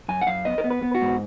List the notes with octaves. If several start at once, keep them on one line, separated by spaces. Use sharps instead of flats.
F#2 G#5
F#5
F#2 F5
B3 D#5
A#4
B3
B4
B3
F#4
G#2